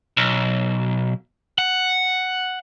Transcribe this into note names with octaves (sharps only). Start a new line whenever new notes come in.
B1
F#5